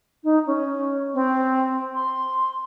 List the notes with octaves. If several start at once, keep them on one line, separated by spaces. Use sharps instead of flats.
D#4
C#4
C4
C6